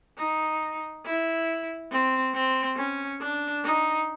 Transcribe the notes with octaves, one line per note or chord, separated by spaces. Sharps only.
D#4
E4
C4
C4
C#4
D4
D#4